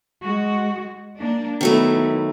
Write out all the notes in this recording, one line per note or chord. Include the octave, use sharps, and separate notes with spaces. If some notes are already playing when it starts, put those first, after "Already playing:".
G#3 F#4
A#3 D4
D#3 F#3 A3 B3 E4